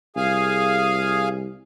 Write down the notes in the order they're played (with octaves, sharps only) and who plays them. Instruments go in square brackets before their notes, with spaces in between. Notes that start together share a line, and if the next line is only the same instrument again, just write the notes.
[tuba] C2 [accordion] G#4 F5 G#5